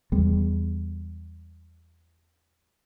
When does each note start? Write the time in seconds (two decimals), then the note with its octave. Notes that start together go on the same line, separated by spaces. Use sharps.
0.12 E2 G3 G#3 B3